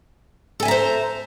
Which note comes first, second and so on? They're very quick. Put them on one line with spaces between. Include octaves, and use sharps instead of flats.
A4 G#5 E5 A#5 C5